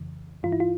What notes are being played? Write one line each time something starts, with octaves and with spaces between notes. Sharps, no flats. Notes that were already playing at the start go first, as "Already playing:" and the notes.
Already playing: F2 C#3 E3
G2 E3 F4
E4
F4